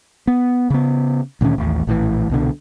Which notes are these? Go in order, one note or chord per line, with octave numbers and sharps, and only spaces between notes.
B3
C#3 B3
D2 A#2 D#3 C#4
A1 D#2
A#1 A2 E3
C2 B2 D3